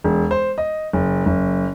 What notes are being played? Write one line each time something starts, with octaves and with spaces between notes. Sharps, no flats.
E1
C5
D#5
F#1
F#1